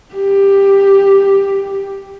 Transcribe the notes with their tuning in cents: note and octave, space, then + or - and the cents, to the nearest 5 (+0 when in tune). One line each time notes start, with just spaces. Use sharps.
G4 +10